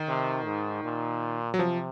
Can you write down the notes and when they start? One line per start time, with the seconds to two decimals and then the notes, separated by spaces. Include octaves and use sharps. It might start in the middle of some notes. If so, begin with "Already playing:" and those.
Already playing: D#3
0.09 C3
0.46 G#2
0.84 A#2
1.54 F#3
1.59 C3 F3